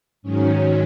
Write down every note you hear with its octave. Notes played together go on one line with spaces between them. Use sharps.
G#2 D#3 F#3 C#4